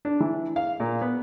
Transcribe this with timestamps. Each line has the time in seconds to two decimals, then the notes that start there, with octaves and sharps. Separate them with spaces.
0.05 D4
0.20 E3
0.56 F5
0.80 A#2
1.01 B3